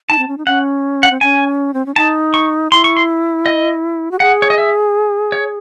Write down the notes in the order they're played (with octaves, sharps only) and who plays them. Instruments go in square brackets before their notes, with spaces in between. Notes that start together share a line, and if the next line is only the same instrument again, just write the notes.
[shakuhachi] D#4 [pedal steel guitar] A5
[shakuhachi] C4
C#4
D#4
[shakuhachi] C#4 [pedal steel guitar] F#5
[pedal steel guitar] F#5
[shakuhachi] C4
[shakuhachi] C#4 [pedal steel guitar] G#5
[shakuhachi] C4
C#4
[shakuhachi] D#4 [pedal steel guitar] A5
[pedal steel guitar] C#6
[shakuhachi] E4 [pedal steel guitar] C6
[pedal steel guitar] C#6
C6
D#5
[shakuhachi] F#4
[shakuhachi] G#4 [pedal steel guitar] F#5
[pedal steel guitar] C#5
D#5
E5
C#5